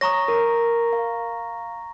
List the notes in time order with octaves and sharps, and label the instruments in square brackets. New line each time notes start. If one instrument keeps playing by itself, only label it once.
[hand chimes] C#5 D#6 [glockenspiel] A#5 C#6 A#6
[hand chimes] A#4
F5